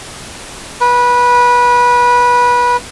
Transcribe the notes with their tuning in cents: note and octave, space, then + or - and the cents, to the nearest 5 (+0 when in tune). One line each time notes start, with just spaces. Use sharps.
B4 -20